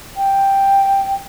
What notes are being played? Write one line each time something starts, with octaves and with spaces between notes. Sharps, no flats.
G5